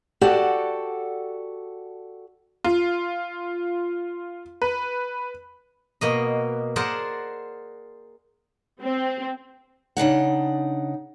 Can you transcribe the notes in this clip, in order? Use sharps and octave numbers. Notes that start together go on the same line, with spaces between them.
F#4 G4 A4 D5 F#5
F4
B4
B2 A#3 D#5
G#4 A#4 C5 D5 F#5 A5
C4
C#3 D4 D#4 F#5